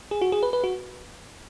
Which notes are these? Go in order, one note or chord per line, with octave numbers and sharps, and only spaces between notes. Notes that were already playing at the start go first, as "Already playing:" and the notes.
G#4
F#4
G#4
B4
B4
F#4